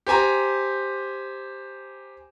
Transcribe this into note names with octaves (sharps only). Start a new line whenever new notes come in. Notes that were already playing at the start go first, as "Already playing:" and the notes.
G4 C5 G#5 A#5